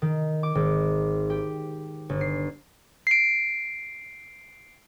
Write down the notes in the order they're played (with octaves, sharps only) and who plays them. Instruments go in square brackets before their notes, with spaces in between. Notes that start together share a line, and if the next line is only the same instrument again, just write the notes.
[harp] D#3
D6
G#1
G4
G1
C7
[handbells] C7 D7